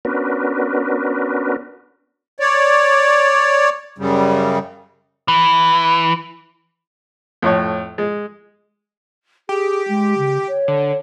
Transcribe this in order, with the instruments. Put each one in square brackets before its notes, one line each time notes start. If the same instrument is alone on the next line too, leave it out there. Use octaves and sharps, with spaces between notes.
[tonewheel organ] B3 C#4 D4 F#4 A#4 B4
[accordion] C#5 D5
F#2 C#3 G3
[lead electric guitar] E3
[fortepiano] F2 A2 C#5
G#3
[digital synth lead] G4 [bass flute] G#4
[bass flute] G#3
C#3
C#5
[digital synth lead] D3